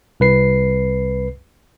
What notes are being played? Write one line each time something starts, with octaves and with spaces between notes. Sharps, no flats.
C2 B4 C7